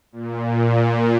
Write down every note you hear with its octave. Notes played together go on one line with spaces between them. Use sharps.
A#2